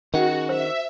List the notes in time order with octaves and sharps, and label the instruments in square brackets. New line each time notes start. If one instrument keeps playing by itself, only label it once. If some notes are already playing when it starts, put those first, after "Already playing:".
[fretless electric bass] D#3 [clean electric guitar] C#4 G#4 F#5 [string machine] F#4
[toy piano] C5 [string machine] E5